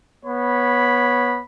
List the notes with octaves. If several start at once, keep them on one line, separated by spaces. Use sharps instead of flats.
B3 C#5 B5